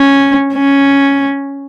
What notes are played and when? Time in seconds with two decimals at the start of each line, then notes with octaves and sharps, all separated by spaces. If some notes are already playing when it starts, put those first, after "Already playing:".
Already playing: C#4
0.54 C#4